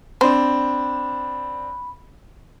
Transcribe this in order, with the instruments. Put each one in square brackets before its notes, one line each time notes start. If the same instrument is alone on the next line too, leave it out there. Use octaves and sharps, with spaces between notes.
[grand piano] C4 D4 [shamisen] C5 [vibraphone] B5